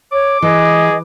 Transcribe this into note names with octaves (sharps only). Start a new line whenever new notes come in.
C#5 D6
E3 G#4 D#5